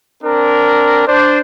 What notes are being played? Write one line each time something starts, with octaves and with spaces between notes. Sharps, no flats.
C4 D4 A#4
D4 C5